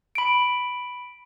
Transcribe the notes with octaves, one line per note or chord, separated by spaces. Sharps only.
B5 D7